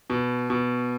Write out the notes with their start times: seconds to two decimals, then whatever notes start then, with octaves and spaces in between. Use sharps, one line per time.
0.10 B2
0.50 B2